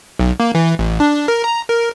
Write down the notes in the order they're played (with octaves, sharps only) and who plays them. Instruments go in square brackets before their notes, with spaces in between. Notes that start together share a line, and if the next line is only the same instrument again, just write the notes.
[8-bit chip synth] B1
A#3
E3
A1
D4
A#4
A#5
A#4